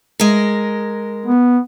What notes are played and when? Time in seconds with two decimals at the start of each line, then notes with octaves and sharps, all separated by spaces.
0.20 G#3 A#4
1.26 B3